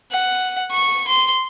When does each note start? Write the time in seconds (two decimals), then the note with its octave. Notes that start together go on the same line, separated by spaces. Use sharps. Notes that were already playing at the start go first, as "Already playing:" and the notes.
0.11 F#5
0.72 C#6
1.08 C6